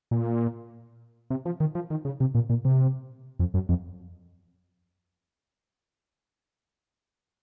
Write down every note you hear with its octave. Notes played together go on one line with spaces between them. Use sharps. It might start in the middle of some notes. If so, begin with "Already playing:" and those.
A#2
C3
F3
D#3
F3
D#3
C#3
C3
A#2
A#2
C3
F2
F#2
F2